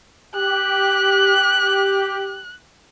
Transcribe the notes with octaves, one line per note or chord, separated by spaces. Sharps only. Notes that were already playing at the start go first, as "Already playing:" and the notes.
G4 F#6